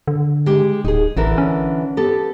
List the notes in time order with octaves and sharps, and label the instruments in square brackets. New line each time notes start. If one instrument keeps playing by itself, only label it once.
[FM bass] D3
[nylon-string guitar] G#3 G4
[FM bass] D1 [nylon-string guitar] D#4 G#4
[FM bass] A1 [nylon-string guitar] D3 E3 A#4
[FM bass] C#4
[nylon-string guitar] B3 G4 A4